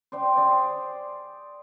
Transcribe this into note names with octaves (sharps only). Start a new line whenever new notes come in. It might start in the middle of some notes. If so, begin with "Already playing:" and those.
C5 D5 G5
G#4 D5 G5